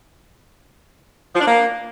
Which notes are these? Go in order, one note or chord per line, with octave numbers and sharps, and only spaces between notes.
F3
D4
A#3